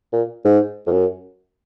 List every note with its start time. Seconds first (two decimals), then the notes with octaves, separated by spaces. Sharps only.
0.13 A#2
0.44 G#2
0.87 F2
0.91 F#2